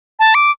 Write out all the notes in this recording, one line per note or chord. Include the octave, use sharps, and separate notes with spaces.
A5
D6